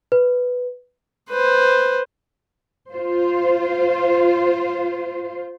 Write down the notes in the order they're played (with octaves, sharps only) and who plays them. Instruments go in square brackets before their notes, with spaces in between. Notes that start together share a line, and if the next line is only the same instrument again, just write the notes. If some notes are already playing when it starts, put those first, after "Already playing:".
[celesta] B4
[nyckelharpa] B4 C5
[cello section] F4 C5